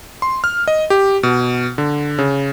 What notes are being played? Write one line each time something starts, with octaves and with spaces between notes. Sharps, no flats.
C6
F6
D#5
G4
B2
D3
C#3